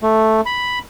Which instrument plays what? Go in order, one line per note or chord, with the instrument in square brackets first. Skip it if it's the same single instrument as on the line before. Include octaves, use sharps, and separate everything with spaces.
[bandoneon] A3
B5